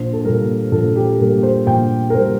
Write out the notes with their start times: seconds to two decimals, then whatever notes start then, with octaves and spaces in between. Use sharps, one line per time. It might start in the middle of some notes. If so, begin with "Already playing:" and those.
Already playing: A#1 C5
0.13 A4
0.24 A#2 G3 A#4
0.72 A#1 A4
0.96 G4
1.19 A#2 G3 A#4
1.43 C5
1.67 A#1 G5
2.10 A#4
2.14 A#2 G3 C5